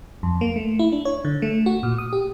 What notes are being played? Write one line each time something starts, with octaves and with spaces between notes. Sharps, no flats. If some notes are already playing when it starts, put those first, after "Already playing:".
F2
A#3
A3
E4
D4
C#5
D3
A3
F#4
A#2
D#6
G4